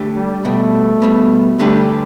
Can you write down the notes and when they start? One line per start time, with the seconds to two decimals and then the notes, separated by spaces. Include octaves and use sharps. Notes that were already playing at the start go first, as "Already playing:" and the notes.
Already playing: D3 A3 G4 B4
0.16 G3
0.45 B2 G3 A3 B3
1.02 B2 G3 B3
1.59 D3 G3 A3 D4 G4 B4